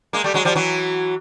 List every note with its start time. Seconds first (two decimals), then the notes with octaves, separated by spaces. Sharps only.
0.13 G#3 A#3
0.24 G3 A3
0.34 F#3 G#3
0.45 F3 G3
0.55 E3 F#3